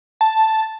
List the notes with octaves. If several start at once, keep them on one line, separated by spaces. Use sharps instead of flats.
A5